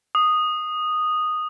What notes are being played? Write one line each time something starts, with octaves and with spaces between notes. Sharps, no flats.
D#6